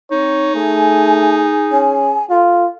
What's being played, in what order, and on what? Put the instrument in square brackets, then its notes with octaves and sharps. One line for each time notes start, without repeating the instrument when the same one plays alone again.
[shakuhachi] C4 [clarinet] D#4 [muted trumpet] C#5
[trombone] A3 [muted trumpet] G#4 [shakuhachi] G#5
[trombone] C#4 [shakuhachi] G#5
[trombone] F4 [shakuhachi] A4